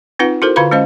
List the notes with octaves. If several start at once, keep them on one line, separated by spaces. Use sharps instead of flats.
C4 D#4 F4 B4 F#5
E4 F#4 A4 A#4 C5
D3 F4 B4 F5 B5 C6
G#3 C#4 C5 D#5 F5